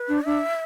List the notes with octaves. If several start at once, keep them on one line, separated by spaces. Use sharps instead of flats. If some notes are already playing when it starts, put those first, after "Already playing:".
Already playing: B4
D4
D4 E5